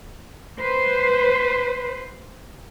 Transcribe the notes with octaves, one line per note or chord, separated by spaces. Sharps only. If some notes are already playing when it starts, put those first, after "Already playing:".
B4 C5